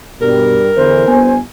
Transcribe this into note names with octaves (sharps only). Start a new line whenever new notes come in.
G2 B2 G3 A#4
E2 D3 E3 C5
G1 B3 G#5